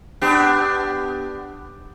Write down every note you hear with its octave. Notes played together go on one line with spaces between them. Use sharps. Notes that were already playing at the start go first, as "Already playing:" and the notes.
B3 D4 G4